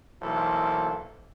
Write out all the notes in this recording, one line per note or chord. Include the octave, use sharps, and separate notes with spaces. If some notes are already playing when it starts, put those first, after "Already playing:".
B1 E3 A#3 A4 C5